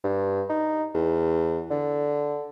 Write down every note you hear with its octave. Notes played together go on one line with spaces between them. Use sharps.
G2
D#4
E2
D3